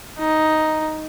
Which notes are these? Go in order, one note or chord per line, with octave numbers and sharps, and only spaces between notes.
D#4